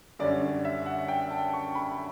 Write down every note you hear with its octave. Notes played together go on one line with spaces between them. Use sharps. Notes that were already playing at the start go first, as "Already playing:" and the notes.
F#2 D3 G3 C#4 D5
E5
F#5
G5
A5
C#6
B5